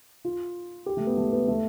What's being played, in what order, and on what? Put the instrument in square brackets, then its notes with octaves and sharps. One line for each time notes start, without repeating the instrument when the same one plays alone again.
[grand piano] F4
G4
A3
B3
A3
B3
A3